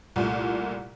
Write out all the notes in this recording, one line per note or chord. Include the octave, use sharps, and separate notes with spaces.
C2 A#2 A3